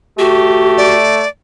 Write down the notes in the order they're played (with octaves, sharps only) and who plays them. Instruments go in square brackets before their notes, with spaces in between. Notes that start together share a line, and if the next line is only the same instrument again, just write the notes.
[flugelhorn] A3 [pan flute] F#4 [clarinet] G4
[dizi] D5